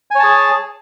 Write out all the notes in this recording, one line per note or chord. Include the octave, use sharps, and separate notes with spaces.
G#4 C#5 G#5 A5